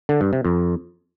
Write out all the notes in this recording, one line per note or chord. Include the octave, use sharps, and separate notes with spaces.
D3
G2
C3
F2